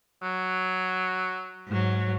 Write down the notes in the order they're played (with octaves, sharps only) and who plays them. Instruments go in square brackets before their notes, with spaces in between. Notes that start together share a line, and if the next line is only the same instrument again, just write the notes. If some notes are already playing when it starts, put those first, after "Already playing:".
[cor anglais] F#3
[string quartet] G#2 F#3